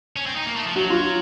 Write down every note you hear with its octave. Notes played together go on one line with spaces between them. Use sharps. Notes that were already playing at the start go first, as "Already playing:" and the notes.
C#4
C4
D#4
A#3
A3
F3
F#3 F#4
F4